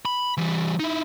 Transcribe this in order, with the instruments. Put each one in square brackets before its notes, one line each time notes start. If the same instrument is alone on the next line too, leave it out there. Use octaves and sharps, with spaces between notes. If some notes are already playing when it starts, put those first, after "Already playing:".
[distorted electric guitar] B5
E3 G3
D#4 E4